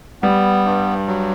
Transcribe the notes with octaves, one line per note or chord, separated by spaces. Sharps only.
G3 B3
G2
F#3